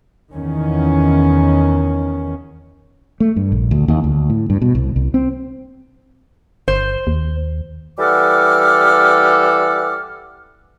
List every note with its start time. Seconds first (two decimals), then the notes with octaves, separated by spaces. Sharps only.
0.33 E2 D#3 C#4
3.20 A3
3.36 G2
3.52 A#1
3.71 D2
3.88 D#2
4.04 D2
4.30 A2
4.50 G2
4.62 B2
4.75 C2
4.96 C2
5.14 C4
6.68 G1 C5
7.07 D#2
7.99 E3 G3 A4 F#5 D6 F6